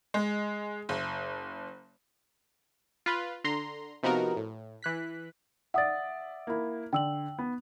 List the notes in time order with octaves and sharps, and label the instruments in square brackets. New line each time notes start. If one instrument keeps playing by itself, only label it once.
[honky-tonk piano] G#3
F#1
[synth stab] F4 B4
D3 A#5 C6
C3 F3 B3 D#4 F#4 A#4
A2
E3 F#6 B6
[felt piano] D5 E5 [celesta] F#5 D#6 A6
[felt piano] A#3 E4
[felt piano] D3 [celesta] G5 E6 F#7
[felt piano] B3